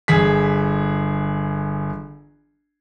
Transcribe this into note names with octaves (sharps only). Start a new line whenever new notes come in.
G1 G#4 B6